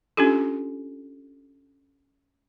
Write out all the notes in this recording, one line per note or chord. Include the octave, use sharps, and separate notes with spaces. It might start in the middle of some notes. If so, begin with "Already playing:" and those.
C#4 D4 F4 G4 A4